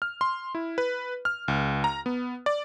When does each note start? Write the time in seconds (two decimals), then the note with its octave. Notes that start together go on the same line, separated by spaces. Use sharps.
0.02 F6
0.21 C6
0.55 E4
0.78 B4
1.25 F6
1.48 C#2
1.84 A#5
2.06 B3
2.46 D5